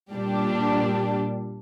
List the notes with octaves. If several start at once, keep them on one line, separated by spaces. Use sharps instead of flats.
A#2 G3 D4 G4